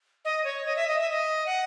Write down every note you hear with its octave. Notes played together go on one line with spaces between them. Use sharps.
D#5
C#5
D#5
E5
D#5
E5
D#5
F#5